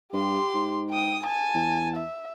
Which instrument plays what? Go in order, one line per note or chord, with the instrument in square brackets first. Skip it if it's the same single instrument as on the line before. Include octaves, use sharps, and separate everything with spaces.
[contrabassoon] G2 [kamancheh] G4 C6
[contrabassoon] G#2
[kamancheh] G5 D#6
G#5 A5
[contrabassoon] E2
[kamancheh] E5